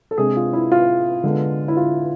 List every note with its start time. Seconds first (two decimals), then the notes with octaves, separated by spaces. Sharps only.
0.11 A4
0.18 C3 G#3 D4 G#4
0.36 F4
0.53 E4
0.72 F4
1.23 D3 G#3 B3 D4
1.68 E4
1.77 F4